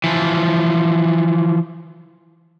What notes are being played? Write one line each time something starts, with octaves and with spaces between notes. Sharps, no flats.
E3 F3